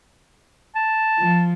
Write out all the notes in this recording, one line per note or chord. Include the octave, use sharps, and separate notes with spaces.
A5
F3